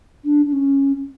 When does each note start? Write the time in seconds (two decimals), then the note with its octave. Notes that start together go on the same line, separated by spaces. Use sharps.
0.24 D4
0.46 D4
0.53 C#4